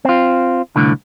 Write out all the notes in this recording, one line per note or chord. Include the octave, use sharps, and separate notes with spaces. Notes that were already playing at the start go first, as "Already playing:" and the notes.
C4 F4
C2 A2 D3